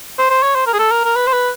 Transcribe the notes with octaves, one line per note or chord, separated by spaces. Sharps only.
C5
C5
C#5
C5
A#4
G#4
A4
A#4
A#4
B4
C5
B4